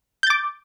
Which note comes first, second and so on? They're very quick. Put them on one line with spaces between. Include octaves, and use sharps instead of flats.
G6 A6 D6